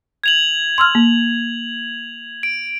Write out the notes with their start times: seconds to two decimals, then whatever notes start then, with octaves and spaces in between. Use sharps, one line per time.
0.24 G#6 F7 F#7
0.78 C6 E6 F6
0.95 A#3
2.43 D7